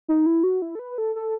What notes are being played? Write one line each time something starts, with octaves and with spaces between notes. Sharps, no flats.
D#4
E4
F#4
E4
A4
B4
A4
A4